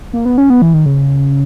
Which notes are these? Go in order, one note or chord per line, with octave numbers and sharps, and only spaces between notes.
A#3
B3
C#4
B3
E3
D#3
C#3